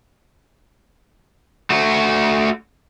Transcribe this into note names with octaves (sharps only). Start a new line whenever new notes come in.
A3 F#4